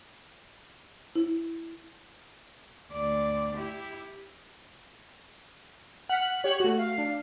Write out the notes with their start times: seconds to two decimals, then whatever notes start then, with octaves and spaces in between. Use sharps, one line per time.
1.15 E4
2.92 D2 D5
3.55 E4 G4
6.09 F#5 F6 B6 F#7
6.44 G4 C#5
6.60 A3 F#4
6.77 F5
6.98 D4